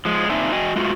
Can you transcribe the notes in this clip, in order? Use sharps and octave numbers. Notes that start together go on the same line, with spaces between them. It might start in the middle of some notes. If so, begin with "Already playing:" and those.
F3 G#3
A#2 C4 D4 D#4 E5 G#5
F#4 D#5 G5 G#5
G#3 A3 F4 F#4